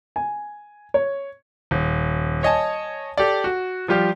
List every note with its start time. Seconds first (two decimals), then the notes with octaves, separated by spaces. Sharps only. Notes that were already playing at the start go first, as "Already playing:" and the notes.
0.16 G#5
0.94 C#5
1.71 D#1
2.43 C#5 D#5 G#5 A5
3.18 G4 A4 D5
3.44 F#4
3.88 F3 G3 F4 G4